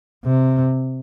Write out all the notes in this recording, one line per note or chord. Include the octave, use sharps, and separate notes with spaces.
C3